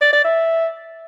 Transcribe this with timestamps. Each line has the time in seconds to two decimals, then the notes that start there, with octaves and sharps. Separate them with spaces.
0.01 D5
0.13 D5
0.24 E5